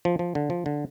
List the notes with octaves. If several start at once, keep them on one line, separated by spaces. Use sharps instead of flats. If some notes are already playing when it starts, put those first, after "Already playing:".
F3
F3
D3
F3
D3